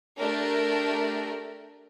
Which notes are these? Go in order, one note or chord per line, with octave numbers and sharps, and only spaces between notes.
A3 D4 G4 A#4